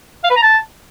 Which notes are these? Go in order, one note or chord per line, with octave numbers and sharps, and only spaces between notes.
F5
B4
A#5
A5